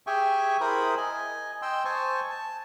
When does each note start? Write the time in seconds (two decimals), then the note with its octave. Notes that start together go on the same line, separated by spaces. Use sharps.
0.07 G4 G#4 E5 G5 G#5 C#6
0.61 E4 G#4 A#4 C5 B5 D#6
0.97 D#5 G#5
1.62 D#5 G5 C6 E6
1.85 C5 G#5 A5 C#6
2.30 A5